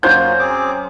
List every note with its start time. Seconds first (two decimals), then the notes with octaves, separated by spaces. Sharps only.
0.03 F#2 A#3 F4 F#4 C5 G6
0.39 C4 G#4 D6